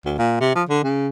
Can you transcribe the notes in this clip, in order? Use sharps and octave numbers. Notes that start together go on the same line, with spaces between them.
D2
A#2
C3
F3
D3
C#3